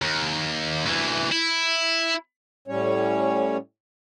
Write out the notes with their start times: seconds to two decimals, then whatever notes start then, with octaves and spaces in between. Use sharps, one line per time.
0.02 D#2
0.86 D2 E3
1.32 E4
2.68 A2 G3 C#4 C#5